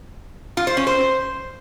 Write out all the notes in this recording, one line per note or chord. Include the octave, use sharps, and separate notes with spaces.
F4
C5
C#4
C5